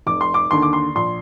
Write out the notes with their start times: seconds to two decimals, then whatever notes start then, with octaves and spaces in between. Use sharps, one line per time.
0.06 F1 D6
0.21 C6
0.34 D6
0.51 D#2 D3 C6
0.62 D6
0.73 C6
0.95 A#1 C6